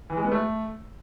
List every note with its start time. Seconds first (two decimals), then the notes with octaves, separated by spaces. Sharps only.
0.10 E3
0.17 G#3
0.24 B3
0.32 A3